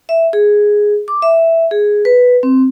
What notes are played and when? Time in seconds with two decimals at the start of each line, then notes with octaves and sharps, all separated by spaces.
0.09 E5
0.33 G#4
1.08 D6
1.22 E5
1.71 G#4
2.05 B4
2.43 C4